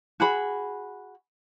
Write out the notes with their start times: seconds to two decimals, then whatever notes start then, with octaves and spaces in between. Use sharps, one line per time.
0.20 F#4 G#4 B5